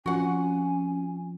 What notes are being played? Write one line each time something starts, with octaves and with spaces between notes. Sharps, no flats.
F3 C4 C#4 F4 F#4 F#5 G#5